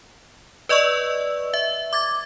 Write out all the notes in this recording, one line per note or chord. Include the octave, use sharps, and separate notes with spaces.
B4 D5 D#5 C#6 E6
E5
D6 G#6 A6